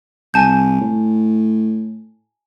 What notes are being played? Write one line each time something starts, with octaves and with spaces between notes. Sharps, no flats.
C2 G#5 A5 G6
A2